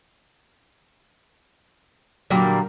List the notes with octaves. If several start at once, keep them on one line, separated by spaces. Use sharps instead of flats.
A#2 D3 F#3 G3 A#3